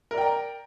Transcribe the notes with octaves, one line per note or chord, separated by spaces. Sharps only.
A#4 D5 G5 A#5